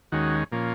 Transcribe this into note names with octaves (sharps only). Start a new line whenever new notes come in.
D#2 D#3 G#3 C#4 F#4
A#2 F3 A#3 C#4